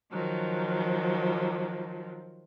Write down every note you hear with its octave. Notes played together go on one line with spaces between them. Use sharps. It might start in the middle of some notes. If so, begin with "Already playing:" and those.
D#3 F3 F#3